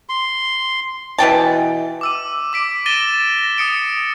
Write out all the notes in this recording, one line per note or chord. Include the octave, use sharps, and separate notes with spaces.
C6
B2 E3 G5 A5
D6 E6 D#7
D6 B6 D7
A6 A#6 D#7 E7 G7
A#6
D#6 C#7 D7